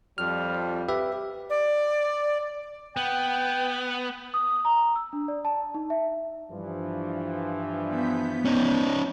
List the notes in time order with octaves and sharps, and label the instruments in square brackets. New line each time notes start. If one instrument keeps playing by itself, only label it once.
[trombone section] F2 F3 G3 [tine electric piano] F6
[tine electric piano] G4 B4 E5
[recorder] D5
[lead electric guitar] B3 [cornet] G5
[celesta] D#6
A#5
E6
D4
D5
A5
D#4
E5
[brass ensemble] G2 E3 F3
[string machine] B3 G6 B6
[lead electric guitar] C#4 D#4